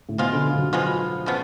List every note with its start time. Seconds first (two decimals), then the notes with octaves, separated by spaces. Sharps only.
0.09 A2
0.18 B2 F3 G#3 B3 F4
0.32 D3
0.46 D3
0.59 F#3
0.73 F3 G#3 B3 F4
1.26 C#3 F3 B3